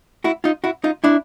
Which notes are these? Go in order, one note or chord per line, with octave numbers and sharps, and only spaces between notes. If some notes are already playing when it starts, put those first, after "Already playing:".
E4 F#4
D#4 F4
E4 F#4
D#4 F4
D4 E4